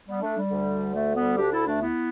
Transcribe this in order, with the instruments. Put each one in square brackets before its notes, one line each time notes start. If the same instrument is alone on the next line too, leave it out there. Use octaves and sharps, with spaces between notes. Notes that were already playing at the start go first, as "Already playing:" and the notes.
[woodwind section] G3 B3
A3 D4
G3
D2 D3
A3
G3 B3
D4 G4
E4 A4
A3 D4
B3 E4